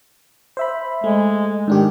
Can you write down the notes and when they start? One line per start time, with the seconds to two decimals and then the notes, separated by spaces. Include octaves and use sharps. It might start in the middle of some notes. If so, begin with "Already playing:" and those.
0.57 C5 E5 B5
1.04 G#3 A3
1.68 G#2 D#3 D4 G4